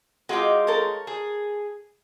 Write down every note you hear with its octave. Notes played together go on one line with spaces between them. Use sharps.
G#3 F4 F#4 G5 D6
A4 A#4 C#5
G#4